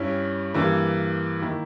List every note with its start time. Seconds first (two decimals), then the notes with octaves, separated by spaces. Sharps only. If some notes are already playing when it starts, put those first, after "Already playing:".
Already playing: G2 G3 C#4 E4
0.54 G2 E3 A#3
1.42 D#3 A#3 E4